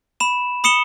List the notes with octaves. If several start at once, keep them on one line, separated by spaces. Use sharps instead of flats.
B5 E7
B5 D#6 C#7 E7 G7